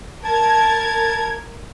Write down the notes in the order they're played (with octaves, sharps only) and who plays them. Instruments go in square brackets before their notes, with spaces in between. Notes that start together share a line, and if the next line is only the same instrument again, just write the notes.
[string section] A#4 G#6 [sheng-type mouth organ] A5